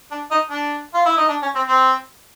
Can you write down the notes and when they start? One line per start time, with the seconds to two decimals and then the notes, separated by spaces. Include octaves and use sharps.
0.11 D4
0.31 D#4
0.50 D4
0.94 F4
1.06 E4
1.17 D#4
1.29 D4
1.42 C#4
1.55 C4
1.68 C4